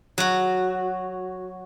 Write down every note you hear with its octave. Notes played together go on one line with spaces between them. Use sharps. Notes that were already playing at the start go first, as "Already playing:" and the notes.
F#3 F#4